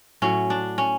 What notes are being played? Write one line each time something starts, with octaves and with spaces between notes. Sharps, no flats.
A2 F#3 C#4
D4
C#4